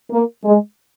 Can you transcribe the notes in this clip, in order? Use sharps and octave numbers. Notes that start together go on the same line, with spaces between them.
A#3
G#3